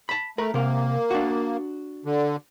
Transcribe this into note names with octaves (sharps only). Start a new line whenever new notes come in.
A5 B5
A3 A#4 B5
C3 A#3 A#4
D4 F#4
D3